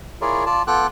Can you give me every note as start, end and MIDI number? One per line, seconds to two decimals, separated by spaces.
0.21 0.44 64
0.21 0.44 65
0.21 0.44 68
0.21 0.44 70
0.21 0.44 73
0.21 0.44 74
0.46 0.62 65
0.46 0.62 74
0.46 0.62 81
0.67 0.87 59
0.67 0.87 65
0.67 0.87 69
0.67 0.87 79
0.67 0.87 86
0.67 0.87 90